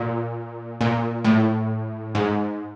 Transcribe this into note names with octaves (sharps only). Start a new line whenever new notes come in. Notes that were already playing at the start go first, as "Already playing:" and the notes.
Already playing: A#2
A#2
A2
G#2